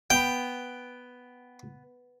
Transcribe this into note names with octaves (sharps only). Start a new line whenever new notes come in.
B3 G5